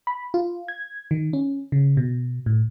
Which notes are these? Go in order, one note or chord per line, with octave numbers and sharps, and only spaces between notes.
B5
F4
G#6
D#3
C#4
C#3
B2
A2